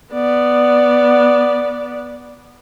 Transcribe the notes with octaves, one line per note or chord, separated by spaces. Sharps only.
B3 D5